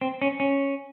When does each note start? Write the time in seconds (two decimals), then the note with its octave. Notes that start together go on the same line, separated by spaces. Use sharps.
0.01 C4
0.22 C#4
0.40 C#4